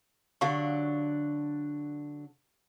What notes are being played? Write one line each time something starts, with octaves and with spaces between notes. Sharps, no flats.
D3 F#3 D4 G4 F5 C#6